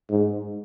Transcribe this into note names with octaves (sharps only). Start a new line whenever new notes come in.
G#2